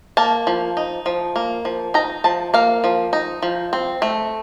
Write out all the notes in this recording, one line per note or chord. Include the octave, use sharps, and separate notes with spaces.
A#3 A5
F3
D#4
F3
A#3
F3
D#4 A#5
F3 A5
A#3 F5
F3
D#4
F3
C4
A3